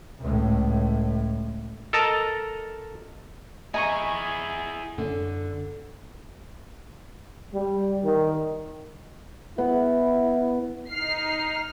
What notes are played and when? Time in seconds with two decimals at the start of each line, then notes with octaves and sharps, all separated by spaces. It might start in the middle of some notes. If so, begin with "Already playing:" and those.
0.20 C#2 A2
1.93 A4 A#4 D#5 A5 A#5
3.74 E4 G#4 D#5 G#5 A#5 C#6
4.98 F#2 D3
7.53 G3
8.04 D#3
9.58 B3 E4
10.90 D#4 F6 C7